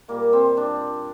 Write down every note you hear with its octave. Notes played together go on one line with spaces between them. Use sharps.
A#2 G3 A#3
C4
D4